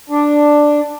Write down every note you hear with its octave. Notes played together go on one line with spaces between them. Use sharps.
D4